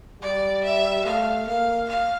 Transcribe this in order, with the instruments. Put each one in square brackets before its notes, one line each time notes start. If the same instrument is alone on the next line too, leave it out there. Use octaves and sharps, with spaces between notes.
[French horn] G3 [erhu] D5
[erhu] E5
[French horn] A3 [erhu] F5
[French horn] A#3 [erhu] F5
[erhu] F5